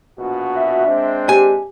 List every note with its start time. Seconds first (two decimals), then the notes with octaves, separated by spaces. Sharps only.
0.19 A#1 B2 F#4
0.56 E5
0.86 G#3 C4 D4
1.29 G4 G#5